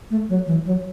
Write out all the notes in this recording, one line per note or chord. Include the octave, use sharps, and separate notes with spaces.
A3
F#3
E3
F#3